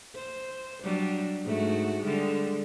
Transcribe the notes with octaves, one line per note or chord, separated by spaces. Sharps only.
C5
F#3 G3 D4
G#2 A3 F#4
D3 G3 G#3